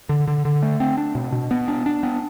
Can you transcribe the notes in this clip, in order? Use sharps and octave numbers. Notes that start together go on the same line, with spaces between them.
D3
D3
D3
A3
C4
D4
B2
B2
B3
D4
D4
B3